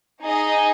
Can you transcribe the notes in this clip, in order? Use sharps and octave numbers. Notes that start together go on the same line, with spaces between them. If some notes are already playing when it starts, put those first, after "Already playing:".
D#4 G#4 D#5